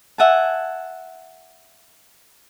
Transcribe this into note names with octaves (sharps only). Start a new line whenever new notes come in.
E5 F#5 G#5 A5